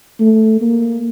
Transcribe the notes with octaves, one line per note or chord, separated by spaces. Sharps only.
A3
A#3